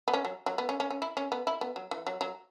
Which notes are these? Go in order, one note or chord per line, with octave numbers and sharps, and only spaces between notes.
B3
C#4
F#3
F#3
B3
C#4
C#4
C#4
E4
C#4
B3
E4
B3
F#3
E3
F#3
F#3